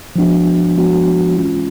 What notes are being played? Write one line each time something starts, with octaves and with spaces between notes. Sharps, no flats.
F3 G#3 B3 D4 F#4
F3 G#3 B3 D4 F#4
E3 G#3 C#4 F4